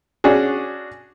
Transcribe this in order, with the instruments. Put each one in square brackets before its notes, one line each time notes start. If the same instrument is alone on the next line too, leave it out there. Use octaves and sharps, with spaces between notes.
[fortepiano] C#4 D4 F#4 G#4